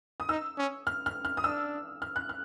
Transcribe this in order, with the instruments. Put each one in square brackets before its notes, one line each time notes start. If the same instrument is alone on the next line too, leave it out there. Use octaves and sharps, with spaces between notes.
[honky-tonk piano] D#6
[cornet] D#4 [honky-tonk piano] E6
[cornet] C#4
[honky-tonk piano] F6
F6
F6
D#6
[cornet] D4 [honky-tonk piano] E6
[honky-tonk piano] F6
F#6
F6